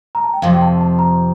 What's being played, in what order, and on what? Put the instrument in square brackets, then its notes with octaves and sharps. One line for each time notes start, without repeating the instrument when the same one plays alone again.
[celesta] A#5
A5
G5
[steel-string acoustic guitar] F2 C3 F3 [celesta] F5
[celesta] G5
A5
A5
A#5